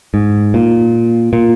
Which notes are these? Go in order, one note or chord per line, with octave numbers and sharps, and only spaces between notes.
G#2
A#2
A#2